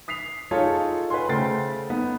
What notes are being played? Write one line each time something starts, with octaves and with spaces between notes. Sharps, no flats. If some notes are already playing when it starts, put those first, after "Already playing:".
D#6 B6 C7 F7
D#4 F4 G#4 A4 C#5
B4 F#5 G#5 C6
C#3 A3 C5 G5 A6 C7
B3 D#4